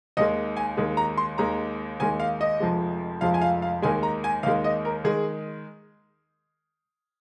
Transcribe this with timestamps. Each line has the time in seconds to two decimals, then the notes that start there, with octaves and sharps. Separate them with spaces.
0.17 D#2 D#3 G#3 D#5
0.57 G#5
0.77 D#2 D#3 G#3
0.97 A#5
1.17 C6
1.38 D#2 D#3 G#3 A#5
2.00 D#2 D#3 G#3 G#5
2.20 F5
2.41 D#5
2.60 F1 F2 F3 G#3
3.21 F1 F2 F3 G#3 F5
3.34 G#5
3.41 F5
3.62 F5
3.82 D#2 D#3 G#3 G#5
4.03 A#5
4.24 G#5
4.43 D#2 D#3 G#3 F5
4.64 D#5
4.85 A#4
5.04 D#3 G#3 G#4